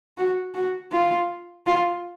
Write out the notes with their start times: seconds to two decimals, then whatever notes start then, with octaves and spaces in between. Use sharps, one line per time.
0.18 F#4
0.55 F#4
0.92 F4
1.67 F4